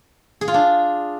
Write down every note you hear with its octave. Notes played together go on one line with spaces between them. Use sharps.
G#4
F4
D4